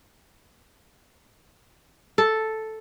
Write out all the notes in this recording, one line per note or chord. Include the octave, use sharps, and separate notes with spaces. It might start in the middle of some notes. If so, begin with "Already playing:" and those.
A4